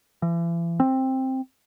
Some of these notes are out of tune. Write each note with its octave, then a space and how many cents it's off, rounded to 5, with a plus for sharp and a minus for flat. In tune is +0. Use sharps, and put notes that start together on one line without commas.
E3 +40
C4 +10